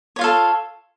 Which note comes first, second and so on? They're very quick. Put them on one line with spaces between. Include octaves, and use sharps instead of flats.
C#5 F4 F5 A4